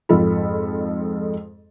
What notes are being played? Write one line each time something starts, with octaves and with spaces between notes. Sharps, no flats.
F2 G#2 F4 A4 B5